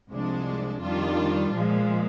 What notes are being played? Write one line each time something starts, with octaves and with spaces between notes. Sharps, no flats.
C2 C3 F3 G#3 D4
F2 D#3 G3 D4 F4
A#2 F3 G#3